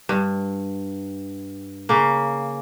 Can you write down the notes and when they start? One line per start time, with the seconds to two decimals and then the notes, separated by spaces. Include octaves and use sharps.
0.09 G2
1.89 C#3 A#3